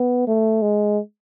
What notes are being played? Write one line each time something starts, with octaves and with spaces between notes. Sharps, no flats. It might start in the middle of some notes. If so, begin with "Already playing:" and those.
Already playing: B3
A3
G#3